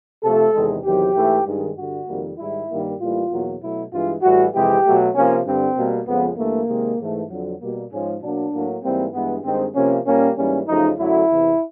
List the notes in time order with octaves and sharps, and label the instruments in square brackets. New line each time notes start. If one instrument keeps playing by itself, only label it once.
[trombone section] C3 F3 A3 A4
E2 C3 D#3 G#3
E2 C3 D#3 F#3 G4
G#2 E3 A3
G2 D#3 G#3
G2 D3 G3 F#4
F2 C3 D#3 G3 A#3
G#2 D#3 G3 E4
G2 D#3 G3 A#3
A2 E3 G3 A#3 F4
E2 B2 F#3 A#3
B2 F#3 A3 E4
G2 E3 G#3 F4
A2 E3 G3 F#4
F2 C3 E3 G#3 G4
B2 F#3 A3
C3 F3 A#3 C#4
G2 D3 G3 C4
B2 G3 A#3
F2 C#3 F3 G#3 B3
G2 E3 A3 A#3
C3 D#3 G#3
G#2 E3 A3
F2 D3 F#3
B2 G3 A#3
G#2 F3 G#3 C#4
B2 F#3 A#3 D4
A2 F#3 A#3
G#2 E3 G3 A#3 C4
G2 E3 G#3 B3
G2 D#3 G#3 C4
C3 F3 A#3 C#4
A#2 G3 A#3 C#4
G#2 E3 G3 A#3 C#4
F#2 C#3 F3 A3 D#4
F#2 D3 F#3 A3 E4
E2 C3 E3